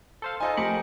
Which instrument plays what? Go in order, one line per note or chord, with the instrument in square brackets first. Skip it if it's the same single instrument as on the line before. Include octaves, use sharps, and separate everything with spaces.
[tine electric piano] A4 C5 F5
[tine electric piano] D#4 F4 A4 [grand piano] C5 D#5 G#5
[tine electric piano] F2 C#7 [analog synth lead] A3 [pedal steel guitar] G4 A#4 B5